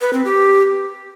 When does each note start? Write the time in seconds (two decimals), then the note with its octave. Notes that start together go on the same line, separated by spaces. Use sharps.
0.01 B4
0.13 C4
0.25 G4